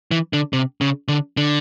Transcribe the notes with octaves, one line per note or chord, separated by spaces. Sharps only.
E3
D3
C3
C#3
D3
D3